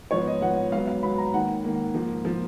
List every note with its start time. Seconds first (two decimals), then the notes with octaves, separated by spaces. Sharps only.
0.11 G#2 F3 B3 C#5
0.27 D#5
0.41 G#2 F3 B3 F#5
0.72 G#2 F#3 B3 F5
0.87 F5
1.03 G#2 F#3 B3 B5
1.18 A#5
1.34 G#2 D#3 A#3 F#5
1.64 G#2 D#3 A#3
1.94 G#2 F3 A#3
2.25 F3 A#3